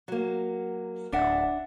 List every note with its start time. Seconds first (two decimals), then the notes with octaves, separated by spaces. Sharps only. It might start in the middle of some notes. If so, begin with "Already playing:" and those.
0.08 F#3 A#3
1.12 D1 D4 E5 F#5